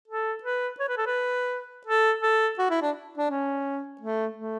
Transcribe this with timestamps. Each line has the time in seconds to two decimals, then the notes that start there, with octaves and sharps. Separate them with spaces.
0.08 A4
0.44 B4
0.80 C#5
0.89 B4
0.97 A4
1.07 B4
1.87 A4
2.22 A4
2.59 F#4
2.71 E4
2.82 D4
3.18 D4
3.30 C#4
4.01 A3
4.37 A3